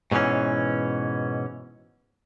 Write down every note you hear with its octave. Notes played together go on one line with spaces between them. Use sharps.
G#2 B2 D3 E3 C#4